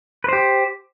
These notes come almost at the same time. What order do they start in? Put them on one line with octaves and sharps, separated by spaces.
B4 C5 G4